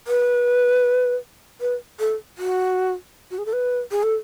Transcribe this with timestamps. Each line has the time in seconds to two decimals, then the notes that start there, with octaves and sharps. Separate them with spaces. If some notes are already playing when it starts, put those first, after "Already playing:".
0.08 B4
1.61 B4
2.00 A4
2.38 F#4
3.31 F#4
3.38 G#4
3.46 A4
3.53 B4
3.91 G#4
4.03 A4